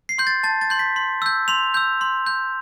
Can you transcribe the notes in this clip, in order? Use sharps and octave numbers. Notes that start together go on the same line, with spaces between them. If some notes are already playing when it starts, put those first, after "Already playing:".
C7
C6 G6
A6
A5 A6
A6
C6 G6
B6
C6
E6 G6
C6 F7
E6 G6
C6
G6